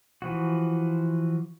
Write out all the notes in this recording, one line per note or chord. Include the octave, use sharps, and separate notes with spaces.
E3 F3 F#4